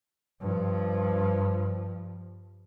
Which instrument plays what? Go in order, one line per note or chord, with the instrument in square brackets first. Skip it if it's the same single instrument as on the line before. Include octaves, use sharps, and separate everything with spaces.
[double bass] G2 F3